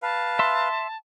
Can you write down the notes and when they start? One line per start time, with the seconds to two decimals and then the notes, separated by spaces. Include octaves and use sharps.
0.03 B4 F5 A5
0.39 E5 C6